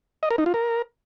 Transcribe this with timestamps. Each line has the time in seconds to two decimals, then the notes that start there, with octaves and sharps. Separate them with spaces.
0.23 D#5
0.31 A#4
0.38 D#4
0.46 F4
0.54 A#4